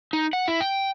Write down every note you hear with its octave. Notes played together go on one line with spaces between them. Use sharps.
D#4
F#5
E4
G5